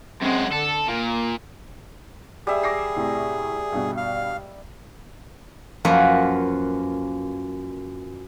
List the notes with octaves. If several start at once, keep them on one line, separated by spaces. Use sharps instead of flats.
F#2 G#3 C4 F#5
D3 A4
A#2 A#3
G3 G#4 E5
D6 A#6 C7
A2 C3
G2 B2
F5
F#2 F3 A#3 F#4 B4